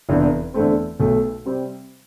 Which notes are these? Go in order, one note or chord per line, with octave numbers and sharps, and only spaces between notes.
F1 E2 D3
E2 D3 A3 C4
B1 B2 A3
C3 G3 C4